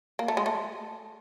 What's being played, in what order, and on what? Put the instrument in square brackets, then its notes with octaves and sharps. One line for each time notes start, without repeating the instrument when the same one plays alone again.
[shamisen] A#3
A3
G#3
A3